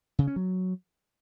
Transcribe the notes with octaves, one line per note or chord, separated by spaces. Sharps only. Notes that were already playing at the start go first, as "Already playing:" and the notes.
C#3
C#4
F#3